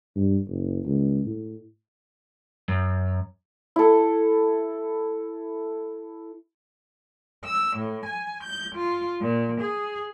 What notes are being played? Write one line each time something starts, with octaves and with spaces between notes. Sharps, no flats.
G2
F#1
C#2
A2
F#2
E4 A4
E6
A2
G#5
G6
F4
A#2
G#4